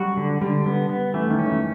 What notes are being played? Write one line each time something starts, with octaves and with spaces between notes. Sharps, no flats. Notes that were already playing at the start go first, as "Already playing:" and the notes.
Already playing: F#3 G3 F#4
D3
D3 G3
G3 B3
B3
E3 A3
D#3
C#4
D#3